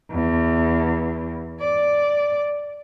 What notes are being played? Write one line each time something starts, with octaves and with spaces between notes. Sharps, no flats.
E2
D5